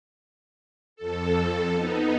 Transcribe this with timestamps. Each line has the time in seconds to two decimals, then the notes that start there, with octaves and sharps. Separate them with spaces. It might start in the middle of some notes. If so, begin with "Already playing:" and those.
0.96 F2 A4
1.72 B3 D#4